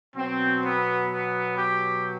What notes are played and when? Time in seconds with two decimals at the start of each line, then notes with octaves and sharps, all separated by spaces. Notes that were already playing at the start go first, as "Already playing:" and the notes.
0.16 B2 F#3 C4
0.63 B3
1.10 B3
1.57 G4